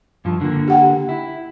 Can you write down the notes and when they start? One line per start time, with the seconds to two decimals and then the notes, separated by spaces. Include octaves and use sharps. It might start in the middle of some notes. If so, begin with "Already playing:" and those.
0.25 G2 F3
0.41 D3 A#3
0.68 G4 F#5 G5
1.09 E4